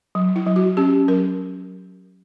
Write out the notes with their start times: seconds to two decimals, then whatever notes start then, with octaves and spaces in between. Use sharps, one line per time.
0.15 F#3
0.36 E4
0.46 F#3
0.56 F#4
0.77 C#4 G4
1.08 F#3 A#4